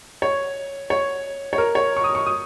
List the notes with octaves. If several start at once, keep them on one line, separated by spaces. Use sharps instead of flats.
C#5
C#5
C#5
A#4
C#5
C#6
D#6
C#6
D#6